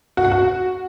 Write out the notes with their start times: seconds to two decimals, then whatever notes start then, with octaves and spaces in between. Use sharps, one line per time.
0.17 F#4
0.24 F#5
0.32 F#4